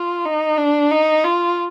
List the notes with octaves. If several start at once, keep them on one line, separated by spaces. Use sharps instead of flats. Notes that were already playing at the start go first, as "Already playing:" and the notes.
Already playing: F4
D#4
D4
D#4
F4